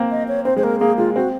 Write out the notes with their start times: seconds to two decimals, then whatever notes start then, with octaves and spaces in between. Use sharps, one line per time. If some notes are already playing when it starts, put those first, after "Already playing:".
Already playing: A#3 C4
0.11 D#5
0.28 C#5
0.45 C4 C5
0.56 G#3 C5
0.63 A#3 A#4
0.80 A#3 G#4
0.98 G#3 F4
1.15 C4 F#4